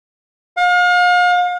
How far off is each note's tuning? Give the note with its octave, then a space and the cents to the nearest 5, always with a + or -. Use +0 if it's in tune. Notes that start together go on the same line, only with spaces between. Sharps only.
F5 +40